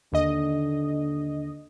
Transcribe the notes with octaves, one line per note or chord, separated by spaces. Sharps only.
D#2 D3 D#5